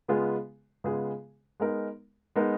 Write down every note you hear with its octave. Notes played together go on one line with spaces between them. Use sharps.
C#3 G#3 B3 F4 G#4
C#3 G#3 B3 F4 G#4
G#3 B3 D#4 A#4
G#3 B3 D#4 A#4